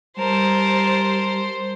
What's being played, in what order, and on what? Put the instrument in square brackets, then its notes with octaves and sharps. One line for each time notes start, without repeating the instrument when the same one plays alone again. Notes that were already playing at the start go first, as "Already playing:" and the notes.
[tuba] G3 [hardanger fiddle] A#4 A5 [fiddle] C5